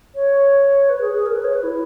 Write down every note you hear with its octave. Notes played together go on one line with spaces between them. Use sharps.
C#5
B4
G#4
G#4
A#4
B4
C#5
B4
E4